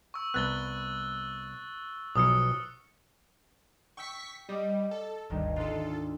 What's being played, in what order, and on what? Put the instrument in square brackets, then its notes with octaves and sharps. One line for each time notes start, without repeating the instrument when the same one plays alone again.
[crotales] C#6 E6
[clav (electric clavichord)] C2 B3 [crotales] F#6 A6 G7
[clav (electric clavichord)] B1 B2 F3 [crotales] D#6 F6 C#7
[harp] G5 E6 [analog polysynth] C#6 B6
[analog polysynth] G3 [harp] D#5 D6
[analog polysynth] A4
[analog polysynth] G1 D2 G2 [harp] D#3
[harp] D2 G#2 [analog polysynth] F4 A4